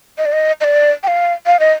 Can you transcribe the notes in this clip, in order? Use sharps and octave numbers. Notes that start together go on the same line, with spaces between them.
D#5
D5
D#5
D#5
D5
G5
F5
F5
D#5